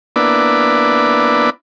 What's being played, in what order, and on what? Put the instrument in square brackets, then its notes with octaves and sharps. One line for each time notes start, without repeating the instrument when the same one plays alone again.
[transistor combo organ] A#3 B3 D4 E4 B4 D5